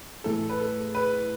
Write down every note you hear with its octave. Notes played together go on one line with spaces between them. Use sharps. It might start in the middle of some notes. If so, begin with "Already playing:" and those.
A2 E3 A3 E4 G#4 A4
B4
A4
B4